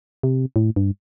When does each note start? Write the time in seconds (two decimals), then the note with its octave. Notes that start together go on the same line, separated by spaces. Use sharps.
0.23 C3
0.56 A2
0.76 G2